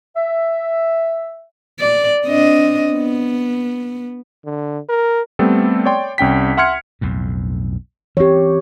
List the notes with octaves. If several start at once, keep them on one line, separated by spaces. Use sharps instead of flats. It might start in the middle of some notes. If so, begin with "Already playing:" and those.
E5
D5
C4 D4 D#5
B3
D3
A#4
G3 A3 B3 C4 A4
C#5 D5 G5 C6
C2 C#4 G5 B6
E5 F#5 C6 F6 G#6 C#7
B1 F2 A2
E3 C4 G4 C#5